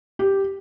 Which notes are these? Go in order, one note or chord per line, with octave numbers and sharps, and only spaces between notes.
G4